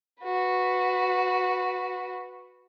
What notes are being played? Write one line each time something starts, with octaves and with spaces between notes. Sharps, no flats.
F#4 B4